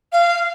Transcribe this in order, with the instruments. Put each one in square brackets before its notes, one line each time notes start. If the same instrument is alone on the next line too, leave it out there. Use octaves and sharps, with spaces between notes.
[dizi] F5